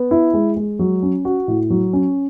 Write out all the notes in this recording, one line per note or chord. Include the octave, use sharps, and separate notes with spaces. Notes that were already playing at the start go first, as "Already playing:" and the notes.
Already playing: B3
E4
G#3
G#3
F#3
C#4
F#4
A2
F#3
C#4